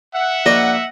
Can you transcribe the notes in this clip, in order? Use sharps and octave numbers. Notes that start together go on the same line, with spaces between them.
E5 F#5
A#1 D5 D#5 C#6